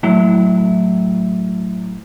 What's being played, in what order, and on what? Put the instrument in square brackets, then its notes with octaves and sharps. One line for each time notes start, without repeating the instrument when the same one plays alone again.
[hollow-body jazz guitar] A2 F#3 E4